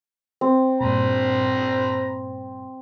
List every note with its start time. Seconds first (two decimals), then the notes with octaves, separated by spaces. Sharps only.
0.41 C4
0.81 G2 A#2 C5 A#5 B5